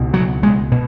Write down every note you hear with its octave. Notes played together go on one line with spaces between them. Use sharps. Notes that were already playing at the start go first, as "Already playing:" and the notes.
Already playing: C#2 B2
F#3
G#3
B2